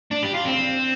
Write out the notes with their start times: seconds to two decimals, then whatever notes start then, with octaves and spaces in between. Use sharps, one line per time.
0.11 D4
0.23 G4
0.34 F4
0.45 C4